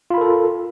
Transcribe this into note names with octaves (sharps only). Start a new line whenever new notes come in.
F4 A4 A#4 B5